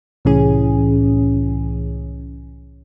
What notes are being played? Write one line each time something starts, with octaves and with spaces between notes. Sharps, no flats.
C2 A2 E3 C#4 G#4